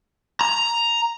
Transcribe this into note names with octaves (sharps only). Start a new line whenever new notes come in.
A#5